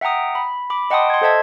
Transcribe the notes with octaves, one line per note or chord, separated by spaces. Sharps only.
E5 F#5 G5 A#5 D#6
B5
B5 D6
D#5 F#5 G5 A5 C6 D#6
C6 G#6
A4 C5 D#5 E5 A5 G#6